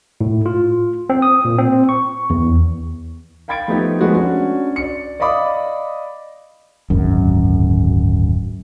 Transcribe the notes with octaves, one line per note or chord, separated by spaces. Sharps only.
A2
F4
C4
D#6
A#2
C4
C#6
E2
F5 G5 B5 G#6 A6 D7
F3 A3 B3 D#4 G4
F3 G#3 A3 B3 F#4
C#4 D4 F#4
D5 C#7
D5 D#5 F5 B5 D6 D#6
D1 G#1 F#2